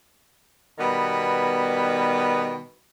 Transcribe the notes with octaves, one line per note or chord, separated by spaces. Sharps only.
B2 D#3 G3 B3